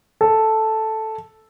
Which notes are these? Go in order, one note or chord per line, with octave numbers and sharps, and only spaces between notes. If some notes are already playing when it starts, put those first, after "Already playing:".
A4